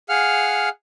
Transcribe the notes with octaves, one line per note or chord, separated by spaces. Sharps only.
G#4 F5 F#5 F6